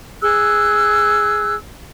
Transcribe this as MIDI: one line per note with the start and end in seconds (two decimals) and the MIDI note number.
0.22 1.55 68
0.22 1.55 88
0.22 1.55 90